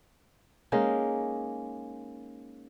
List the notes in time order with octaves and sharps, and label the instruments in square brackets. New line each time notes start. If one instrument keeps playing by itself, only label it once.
[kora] G#3 A#3 C#4 D#4